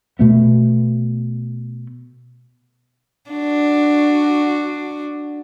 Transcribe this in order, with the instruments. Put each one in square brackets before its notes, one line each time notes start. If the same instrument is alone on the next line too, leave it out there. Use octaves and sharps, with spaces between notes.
[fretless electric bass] B2 A3 B3
[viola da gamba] D4 F#4